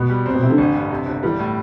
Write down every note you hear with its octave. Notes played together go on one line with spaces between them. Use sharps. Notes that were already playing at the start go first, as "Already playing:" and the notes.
Already playing: B2 B3
G3
C3 C4
B2
C3 E4
D3
A1
G2
C3
G1
E3 G3
A2